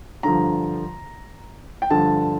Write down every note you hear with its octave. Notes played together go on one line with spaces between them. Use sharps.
G2 D3 F3 A#5
G5
G2 D3 F3 A5